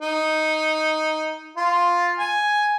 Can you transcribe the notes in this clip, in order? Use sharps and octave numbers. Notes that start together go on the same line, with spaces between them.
D#4
F4
G#5